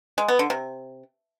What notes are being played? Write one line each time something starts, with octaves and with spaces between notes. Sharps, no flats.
G#3
B3
D3
C3